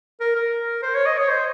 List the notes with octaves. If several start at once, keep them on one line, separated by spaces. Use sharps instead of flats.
A#4
A#4
C5
C#5
D#5
C#5
C5